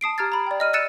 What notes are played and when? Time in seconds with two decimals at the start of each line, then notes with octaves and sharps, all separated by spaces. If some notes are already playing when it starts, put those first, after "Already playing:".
0.01 A5 D#6 C7 D7
0.18 G4 A#5 F6 G#6 A6
0.32 A#5 B5
0.47 D5 G5
0.60 D#5 F6 D#7
0.73 E6 F#6 A6 C#7 D#7 E7